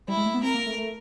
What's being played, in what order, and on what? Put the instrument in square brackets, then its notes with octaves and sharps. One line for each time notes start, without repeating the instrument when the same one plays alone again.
[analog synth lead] G3 [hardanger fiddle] E4
[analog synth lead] G#3
A3
B3
[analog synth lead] C4 [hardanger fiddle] A#4
[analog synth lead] A#3
A3
A3